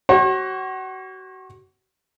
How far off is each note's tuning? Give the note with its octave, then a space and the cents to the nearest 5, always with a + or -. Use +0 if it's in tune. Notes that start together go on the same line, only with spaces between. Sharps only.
F#4 +30 C#5 -40